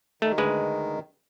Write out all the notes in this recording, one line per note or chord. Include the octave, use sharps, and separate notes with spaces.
D#3 A3
D2 G#3 B4